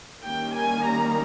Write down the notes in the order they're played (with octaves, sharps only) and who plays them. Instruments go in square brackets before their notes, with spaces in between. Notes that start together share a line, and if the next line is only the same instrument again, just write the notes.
[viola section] D#3 G3 A#3 C#4 G5
G#5
A#5